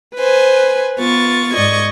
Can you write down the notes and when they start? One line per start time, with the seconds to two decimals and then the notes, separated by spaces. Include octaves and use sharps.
0.16 B4 C5 G#5
0.99 B3 F4 C#6 A6
1.54 G#2 D5 D#5 C#6 G#6